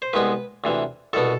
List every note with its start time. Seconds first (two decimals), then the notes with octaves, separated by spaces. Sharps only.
0.02 C5
0.13 C2 C3 G#3 B3 B4
0.64 D2 C3 E3
1.13 C2 B2 B3 A4